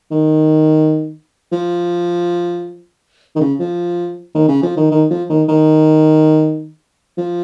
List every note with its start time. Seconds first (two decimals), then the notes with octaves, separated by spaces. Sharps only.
0.11 D#3
1.52 F3
3.36 D#3
3.41 C#3
3.60 F3
4.35 D#3
4.49 C#3
4.63 F3
4.77 D#3
4.91 D#3
5.11 F3
5.30 D#3
5.49 D#3
7.18 F3